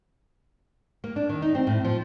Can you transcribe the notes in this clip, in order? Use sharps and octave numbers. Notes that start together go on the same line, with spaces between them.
A#3
D4
D#3
D#4
C4
A2
F3